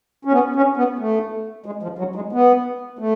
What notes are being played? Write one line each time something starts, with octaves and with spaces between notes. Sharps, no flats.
C#4
B3
C#4
B3
A3
G#3
F3
F#3
G#3
B3
A3